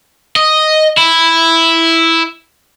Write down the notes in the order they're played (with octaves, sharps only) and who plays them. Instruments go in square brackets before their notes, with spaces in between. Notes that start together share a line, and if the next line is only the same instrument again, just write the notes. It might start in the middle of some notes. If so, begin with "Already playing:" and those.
[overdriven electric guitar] D#5
E4